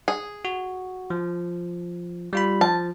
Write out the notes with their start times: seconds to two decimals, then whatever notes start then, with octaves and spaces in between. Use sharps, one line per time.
0.08 G#4
0.45 F#4
1.10 F3
2.33 G3 F4 B5
2.61 F3 A5